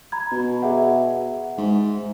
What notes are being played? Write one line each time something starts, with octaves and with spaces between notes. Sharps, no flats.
A#5 B5 G#6
B2
G#4 E5 F#5
G#2